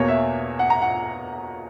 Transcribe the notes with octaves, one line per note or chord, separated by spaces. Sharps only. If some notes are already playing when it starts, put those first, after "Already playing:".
Already playing: E2 B2 A#3 C#5
E5
F#5
A#5
F#5